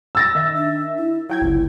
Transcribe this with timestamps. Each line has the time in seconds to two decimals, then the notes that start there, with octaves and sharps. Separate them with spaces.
0.15 E6 A6 A#6
0.35 D#3 E5
0.56 D4
0.98 E4
1.30 F#3 E4 G5 G#6
1.42 G1 C#2